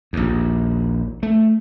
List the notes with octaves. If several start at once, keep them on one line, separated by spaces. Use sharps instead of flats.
A#1 D#2
A3